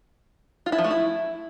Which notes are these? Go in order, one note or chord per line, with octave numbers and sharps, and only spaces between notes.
F4
E4
F3
A3
E4